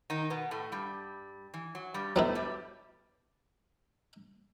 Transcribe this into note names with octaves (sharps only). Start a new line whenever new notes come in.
D#3 D#4
B2 B3
A2 A3
G2 G3
E3
F#3
G2 G3
A2 F#3 A3 B3 E4
G2 G3